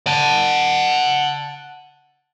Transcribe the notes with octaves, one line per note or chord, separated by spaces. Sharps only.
F#5 A5